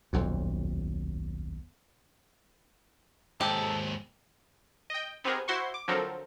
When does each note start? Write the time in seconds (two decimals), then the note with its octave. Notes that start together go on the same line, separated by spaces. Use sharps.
0.13 D#1 B1 F2
3.41 D#2 G#2 D#4 G4 A4
4.90 D#5 G5
5.24 B3 C4 D#4 G4 G#4 A#4
5.48 E4 F#4 C5 C6 C#6
5.74 D6
5.88 D3 F3 F#3 C4 A4 A#4